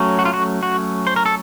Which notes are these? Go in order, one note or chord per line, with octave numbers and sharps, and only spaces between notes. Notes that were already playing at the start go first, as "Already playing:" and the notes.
Already playing: F#3 A3 C#4
F#4
F4
F#4
F#4
C5
A#4
A4